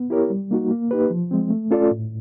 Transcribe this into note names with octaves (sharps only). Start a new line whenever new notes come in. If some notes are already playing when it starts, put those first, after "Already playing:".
Already playing: B3
E4 G4 A#4 C#5
G3
A#3 D#4 F#4
A#3
D#4 G4 B4
F3
G#3 C4
A3
C#4 F4 A4 D5
A2